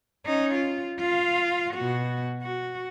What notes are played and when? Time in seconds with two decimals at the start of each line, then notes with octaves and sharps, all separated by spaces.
0.26 C#4 D#4
0.55 F4
0.99 F4 F5
1.74 B2 F#4
2.43 F#4